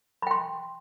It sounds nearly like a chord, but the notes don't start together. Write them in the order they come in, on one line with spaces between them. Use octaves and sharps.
B5 G5 C6